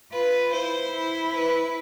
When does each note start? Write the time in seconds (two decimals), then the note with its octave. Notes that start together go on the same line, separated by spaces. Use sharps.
0.12 F4 B4
0.52 E4 C5
0.93 E4
1.34 B4